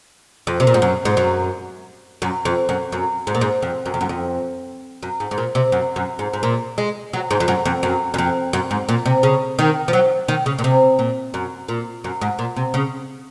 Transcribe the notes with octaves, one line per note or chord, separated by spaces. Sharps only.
F2
C3
A#2
G#2
F#2
G#2
F#2
F#2
F2
F#2
F#2
G#2
A#2
G#2
F2
F#2
F2
F#2
F2
F#2
G#2
G#2
A#2
C3
F#2
F#2
G#2
G#2
A#2
G#3
F#3
G#2
F2
F#2
F2
F#2
F#2
F2
F#2
G#2
A#2
C3
C#3
D#3
F3
F#3
D#3
C#3
A#2
C3
A#2
F#2
A#2
F#2
G#2
A#2
C3
C#3